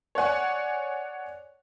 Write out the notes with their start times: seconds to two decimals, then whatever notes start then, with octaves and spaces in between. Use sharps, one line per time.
0.15 C#5 D5 F#5 G#5